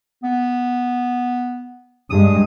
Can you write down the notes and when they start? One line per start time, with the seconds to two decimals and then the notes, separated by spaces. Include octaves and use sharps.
0.23 B3
2.10 G2 G#3 D#6